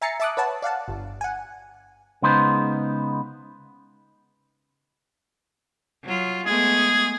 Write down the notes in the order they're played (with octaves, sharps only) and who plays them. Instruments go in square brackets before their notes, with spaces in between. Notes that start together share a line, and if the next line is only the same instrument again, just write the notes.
[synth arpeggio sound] E5 G#5 A#5 A6 C7 C#7
E5 A5 D6 D#6 F#6
B4 C#5 F#5 A5
D5 F5 F#5 A5
G1
F#5 G#5
[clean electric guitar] C#3 G#3 B3 D#4 C5
[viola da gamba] F#3 F4
[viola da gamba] G#3 A3 B3 [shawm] G#4